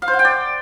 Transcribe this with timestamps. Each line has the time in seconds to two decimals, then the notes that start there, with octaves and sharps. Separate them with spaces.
0.02 F5
0.08 C5
0.13 F#5
0.19 G5
0.25 D5